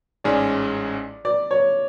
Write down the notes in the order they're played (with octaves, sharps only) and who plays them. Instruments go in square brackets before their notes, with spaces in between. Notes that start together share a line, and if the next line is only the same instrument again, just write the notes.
[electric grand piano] A1 G#2 G#3 C#4 G#4 [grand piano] D5
[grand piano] D5
C#5